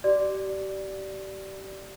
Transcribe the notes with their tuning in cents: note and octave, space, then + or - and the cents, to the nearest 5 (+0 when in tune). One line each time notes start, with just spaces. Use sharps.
G4 -35 D5 +0